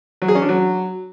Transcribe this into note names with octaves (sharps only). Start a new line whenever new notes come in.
F#3
G#4
C#4
D4
F#3